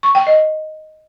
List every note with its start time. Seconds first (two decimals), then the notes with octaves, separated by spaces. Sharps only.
0.03 C#6
0.15 G5
0.27 D#5